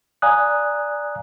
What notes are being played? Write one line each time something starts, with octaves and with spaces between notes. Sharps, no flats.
D5 F5 G#5 A#5 D#6 F#6